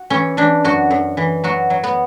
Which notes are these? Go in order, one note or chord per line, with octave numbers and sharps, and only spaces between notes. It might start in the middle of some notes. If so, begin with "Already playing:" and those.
Already playing: F#4
E3 C#4
E3 D4
F#2 F#4
F#2
E3
F#3 F#4
F#3
B3